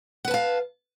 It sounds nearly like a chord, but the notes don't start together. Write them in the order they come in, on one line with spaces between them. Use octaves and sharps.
F#5 B4 A5 F5